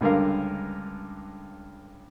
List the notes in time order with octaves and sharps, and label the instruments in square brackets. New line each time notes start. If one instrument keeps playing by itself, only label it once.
[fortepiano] C#2 G2 D3 A#4 F5